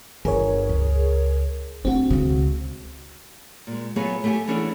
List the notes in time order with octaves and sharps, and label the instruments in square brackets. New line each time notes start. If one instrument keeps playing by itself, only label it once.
[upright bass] G1 [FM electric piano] G#4 A#4 C#5
[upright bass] C#2
[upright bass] A3 D4 [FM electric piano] C4 F#4
[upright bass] C#2 C#3
[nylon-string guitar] A#2 G#3
F#3 A3 B3 F4 G#4 C#5
A3 G4 E5 F5 G#5
E3 B3 C#4 D4 G#4 A4